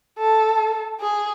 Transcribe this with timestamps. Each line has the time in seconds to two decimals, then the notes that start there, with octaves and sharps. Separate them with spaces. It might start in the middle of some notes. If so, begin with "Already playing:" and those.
0.19 A4
1.01 G#4